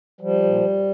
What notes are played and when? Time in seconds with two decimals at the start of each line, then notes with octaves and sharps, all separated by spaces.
0.21 F3 G3
0.43 A#2